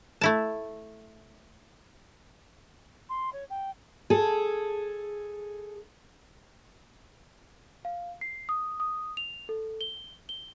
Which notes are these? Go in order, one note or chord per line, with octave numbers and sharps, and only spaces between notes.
A3 E4 A5
C6
C#5
G5
G#4 A4
F5
C7
D#6
D#6
F7
A4
G7
G7